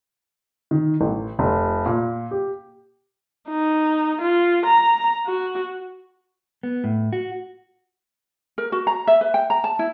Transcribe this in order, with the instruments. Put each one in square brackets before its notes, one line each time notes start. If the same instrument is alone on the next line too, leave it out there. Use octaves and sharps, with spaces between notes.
[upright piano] D#3
A1
F1
A#2
G4
[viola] D#4
F4
A#5
F#4
[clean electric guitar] B3
A2
F#4
[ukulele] A#4
F#4
A#5
E5
B4
G5
A#5
A5
E4